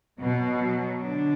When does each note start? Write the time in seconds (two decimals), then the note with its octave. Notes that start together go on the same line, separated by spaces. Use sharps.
0.19 B2 F#3
0.60 F#3
1.02 D3 D4